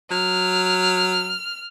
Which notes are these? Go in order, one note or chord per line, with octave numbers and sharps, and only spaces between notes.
F#3 F6